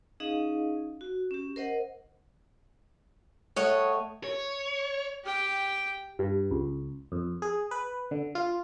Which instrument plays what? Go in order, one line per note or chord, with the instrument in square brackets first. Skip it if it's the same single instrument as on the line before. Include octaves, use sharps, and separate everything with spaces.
[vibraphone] C#4 D#4 G#4 D#5 F5
F#4
C#4 G4
A#4 C5 D#5 F#5
[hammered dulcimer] A3 G5 [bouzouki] C#5 D#5 F#5
[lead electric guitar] C#5
[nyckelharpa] G4 G5
[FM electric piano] G2
C#2
F2
G#4
B4
D3
F4